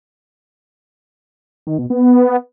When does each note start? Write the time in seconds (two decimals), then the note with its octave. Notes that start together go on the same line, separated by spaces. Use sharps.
1.67 D#3
1.78 B2
1.90 B3